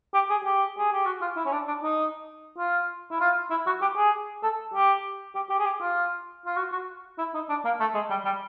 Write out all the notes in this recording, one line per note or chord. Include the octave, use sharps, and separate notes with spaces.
G4
G#4
G4
G#4
G4
F#4
F4
E4
C#4
D4
D4
D#4
F4
E4
F4
E4
F#4
G4
G#4
A4
G4
G4
G4
G#4
G4
F4
F4
F#4
F#4
E4
D#4
D4
A#3
A3
G#3
G3
G3